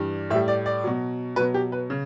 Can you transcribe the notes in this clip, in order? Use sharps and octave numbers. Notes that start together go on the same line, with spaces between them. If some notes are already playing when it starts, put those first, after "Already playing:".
Already playing: G2 E3 G3
A2 G3 E5
D5
D5
B2 F#3
B2 F#3 B4
G4
B4
C#3